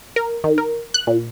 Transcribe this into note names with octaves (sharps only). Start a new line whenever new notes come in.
A#4
D#3
A#4
F#6
A#2